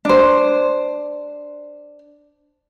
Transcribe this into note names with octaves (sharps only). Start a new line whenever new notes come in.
D4 C5